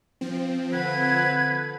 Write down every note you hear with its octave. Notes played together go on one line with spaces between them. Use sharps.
F3 C4
D3 B4 G#6